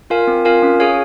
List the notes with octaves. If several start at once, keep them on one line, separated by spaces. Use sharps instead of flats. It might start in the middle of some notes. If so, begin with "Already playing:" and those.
F4 A#4 F5 G#5
C4
F4 A#4 F5 G#5
C#4
G#4 C#5 F5 G#5